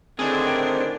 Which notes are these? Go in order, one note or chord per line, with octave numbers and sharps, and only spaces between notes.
A2 D3 D#3 C4 D4 G#4